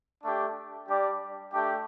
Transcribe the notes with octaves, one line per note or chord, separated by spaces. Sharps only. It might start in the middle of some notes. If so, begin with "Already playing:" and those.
A3 D4 G4
G3 D4 G4 D5
A3 D4 G4